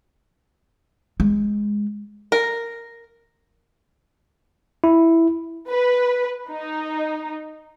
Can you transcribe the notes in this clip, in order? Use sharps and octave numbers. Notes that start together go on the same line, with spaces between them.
G#3
A#4
E4
B4
D#4